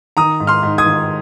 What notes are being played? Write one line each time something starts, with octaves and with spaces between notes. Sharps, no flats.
D#3 A#5 D#6
G#2
C6 F6
G#2
D#6 G#6
D#3